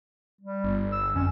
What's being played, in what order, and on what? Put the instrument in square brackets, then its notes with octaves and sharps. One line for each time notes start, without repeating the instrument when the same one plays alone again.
[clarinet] G3
[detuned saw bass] G1
[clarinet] E6
[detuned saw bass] F2 [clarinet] C#4